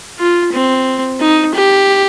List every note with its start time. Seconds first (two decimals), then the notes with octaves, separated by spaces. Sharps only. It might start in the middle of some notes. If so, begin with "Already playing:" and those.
0.19 F4
0.53 C4
1.20 D#4
1.55 G4